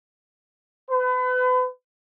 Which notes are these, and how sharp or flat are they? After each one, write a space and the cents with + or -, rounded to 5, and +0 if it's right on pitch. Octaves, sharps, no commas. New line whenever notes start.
B4 +35